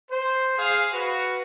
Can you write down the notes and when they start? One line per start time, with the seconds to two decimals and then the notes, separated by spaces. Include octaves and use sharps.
0.10 C5
0.58 G#4 F5
0.93 F#4 B4